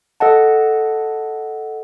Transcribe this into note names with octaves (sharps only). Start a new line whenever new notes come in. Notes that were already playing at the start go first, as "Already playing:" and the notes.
A4 D#5 F#5 A5